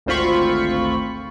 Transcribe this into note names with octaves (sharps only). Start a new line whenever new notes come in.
G#1 D2 C4 F4 B5 C#6